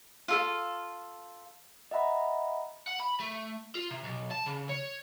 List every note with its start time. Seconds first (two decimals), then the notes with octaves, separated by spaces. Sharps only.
0.28 F4 A4 F5
1.91 D#5 E5 F#5 A#5 B5
2.88 F#5
3.00 B5
3.20 A3
3.75 F4
3.90 C3
4.04 B1
4.31 A5
4.46 C#3
4.69 C#5